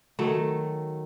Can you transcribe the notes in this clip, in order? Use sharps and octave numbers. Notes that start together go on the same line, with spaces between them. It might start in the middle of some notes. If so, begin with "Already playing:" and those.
D#3 F#3 A3